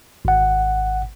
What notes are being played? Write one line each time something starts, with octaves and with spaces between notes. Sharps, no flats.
G#1 F#5